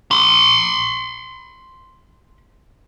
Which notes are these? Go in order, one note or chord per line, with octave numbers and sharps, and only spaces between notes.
B5 C6